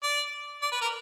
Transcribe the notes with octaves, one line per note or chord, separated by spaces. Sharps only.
D5
D5
B4
A#4